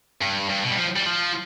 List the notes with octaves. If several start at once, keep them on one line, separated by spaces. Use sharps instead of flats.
G2
G2
B2
G3
F3
G3
E3
F3